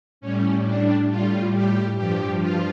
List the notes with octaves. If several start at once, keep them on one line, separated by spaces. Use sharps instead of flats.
A2 G3 C#4
D4
A2 G3 F4
G4
G2 F3 G4
F4